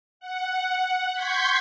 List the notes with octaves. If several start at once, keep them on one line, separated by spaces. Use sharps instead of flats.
F#5
C6 C#6 G6 G#6 B6